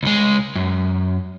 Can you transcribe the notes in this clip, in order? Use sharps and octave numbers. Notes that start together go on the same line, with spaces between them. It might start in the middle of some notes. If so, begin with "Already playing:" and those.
C#2 G#3
F#2